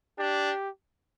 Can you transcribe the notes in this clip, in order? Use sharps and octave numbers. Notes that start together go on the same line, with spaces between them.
D4 G4